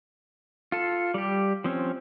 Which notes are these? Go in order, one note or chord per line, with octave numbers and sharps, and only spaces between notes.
F4 A4
G3 G4
F3 C4 C#4